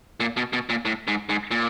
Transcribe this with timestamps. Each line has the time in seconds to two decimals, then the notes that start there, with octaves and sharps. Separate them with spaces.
0.20 A#2
0.37 B2
0.53 B2
0.69 A#2
0.85 A2
1.07 G#2
1.29 G#2
1.51 A#2